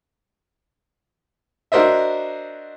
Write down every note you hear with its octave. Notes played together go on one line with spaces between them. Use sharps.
D4 F#4 A#4 C5 D#5 E5